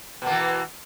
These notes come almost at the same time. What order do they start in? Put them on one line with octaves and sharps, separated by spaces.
B2 A#3 E3